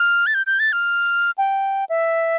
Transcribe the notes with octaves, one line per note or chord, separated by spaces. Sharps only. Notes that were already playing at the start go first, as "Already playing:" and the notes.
Already playing: F6
A6
G6
G6
A6
F6
G5
E5